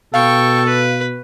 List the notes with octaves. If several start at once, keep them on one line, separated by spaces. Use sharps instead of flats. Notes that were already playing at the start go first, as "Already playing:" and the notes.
B2 A4 F5 G5 C#6
B4